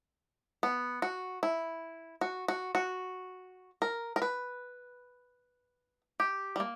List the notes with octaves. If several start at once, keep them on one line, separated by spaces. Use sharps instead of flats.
B3
F#4
E4
F#4
F#4
F#4
A#4
A#4
B4
G4
G3
A#3